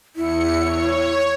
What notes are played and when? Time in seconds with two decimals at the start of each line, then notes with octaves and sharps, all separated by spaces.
0.16 E2 E4 C#7
0.58 C#5